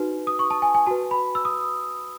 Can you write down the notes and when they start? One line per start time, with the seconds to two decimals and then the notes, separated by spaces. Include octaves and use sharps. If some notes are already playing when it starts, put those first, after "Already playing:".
Already playing: D#4 F#4 B4
0.27 D#6
0.39 C#6
0.50 A5
0.62 G#5
0.74 G#5
0.86 F#4 B4 A5
1.11 B5
1.35 E6
1.45 D#6